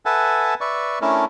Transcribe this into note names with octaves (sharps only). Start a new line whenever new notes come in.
A4 B4 E5 F#5 G#5 A5
B4 D5 E5 C#6
A3 C#4 D4 E4 A4 A#4